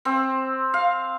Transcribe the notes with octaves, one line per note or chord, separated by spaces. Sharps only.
C4
F5